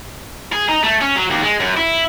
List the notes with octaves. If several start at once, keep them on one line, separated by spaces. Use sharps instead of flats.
G#4
D#4
A3
C#4
F#3
D#2
G#3
F#2
E4